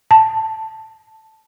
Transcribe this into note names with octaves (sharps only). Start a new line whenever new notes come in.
A5